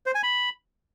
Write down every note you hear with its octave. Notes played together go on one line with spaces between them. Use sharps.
C5
G#5
B5